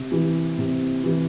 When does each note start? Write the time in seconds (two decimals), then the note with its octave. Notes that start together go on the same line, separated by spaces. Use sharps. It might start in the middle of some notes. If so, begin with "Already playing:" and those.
Already playing: C3
0.12 E3
0.58 C3
1.04 E3